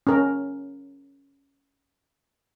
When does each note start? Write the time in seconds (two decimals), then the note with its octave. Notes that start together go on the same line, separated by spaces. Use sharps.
0.07 C#4 A#4